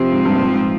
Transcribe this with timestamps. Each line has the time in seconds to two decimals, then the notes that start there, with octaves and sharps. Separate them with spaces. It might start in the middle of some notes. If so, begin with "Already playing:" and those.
Already playing: C3 F3 C4 F4
0.12 G#2
0.25 G2
0.35 A#2
0.40 G#2
0.54 G#2